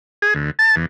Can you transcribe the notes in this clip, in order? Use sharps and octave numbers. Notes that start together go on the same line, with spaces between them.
G#4
D2
A5
E2